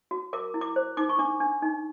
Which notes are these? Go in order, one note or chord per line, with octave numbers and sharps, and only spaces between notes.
F#4
A#4 D6
E4
D6
C5
D#4 D6
C#6
D4 D6
D4
D#4